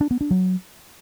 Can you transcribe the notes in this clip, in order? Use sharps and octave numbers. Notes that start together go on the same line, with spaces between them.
D4
B3
D4
F#3